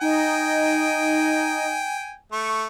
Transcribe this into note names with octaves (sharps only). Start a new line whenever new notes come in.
D#4 D#5 G5 G#5
A3 C#6